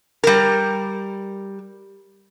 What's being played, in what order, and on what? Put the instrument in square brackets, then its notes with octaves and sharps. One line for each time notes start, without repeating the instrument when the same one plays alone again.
[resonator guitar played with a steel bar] G3 A#4